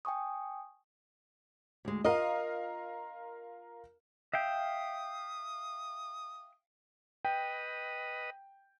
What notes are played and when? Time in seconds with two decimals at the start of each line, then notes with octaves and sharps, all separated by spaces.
0.05 G5 G#5 C#6 D#6
1.85 D2 G#3
2.04 F4 A#4 D#5 F5
4.33 E5 F5 G5 D#6
7.25 B4 D#5 G5